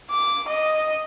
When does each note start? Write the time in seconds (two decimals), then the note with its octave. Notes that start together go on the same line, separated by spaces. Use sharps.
0.10 D6
0.48 D#5